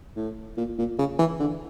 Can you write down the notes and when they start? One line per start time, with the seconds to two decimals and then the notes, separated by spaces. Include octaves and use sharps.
0.16 A2
0.57 A#2
0.78 A#2
0.99 C#3
1.19 E3
1.40 D3